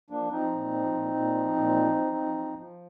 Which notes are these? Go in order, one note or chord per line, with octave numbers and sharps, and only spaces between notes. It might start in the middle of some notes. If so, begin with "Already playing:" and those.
F3 A#3 D4
F3 C4 D#4
A#2
F3
A#2
A#2
F3
A#2
F3
F3
F3
F3
F3